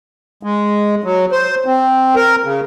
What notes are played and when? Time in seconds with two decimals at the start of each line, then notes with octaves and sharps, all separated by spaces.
0.43 G#3
1.04 F#3
1.32 C5
1.66 C4
2.15 A#4
2.44 C#3